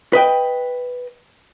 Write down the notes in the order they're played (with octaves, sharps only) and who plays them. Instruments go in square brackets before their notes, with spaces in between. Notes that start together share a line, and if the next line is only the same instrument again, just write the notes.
[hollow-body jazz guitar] B4 D#5 G5